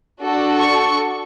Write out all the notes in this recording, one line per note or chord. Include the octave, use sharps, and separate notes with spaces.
D4 F#4 A4
C#6